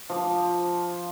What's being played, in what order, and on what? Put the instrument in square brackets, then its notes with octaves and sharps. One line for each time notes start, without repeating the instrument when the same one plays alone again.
[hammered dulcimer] F3 D6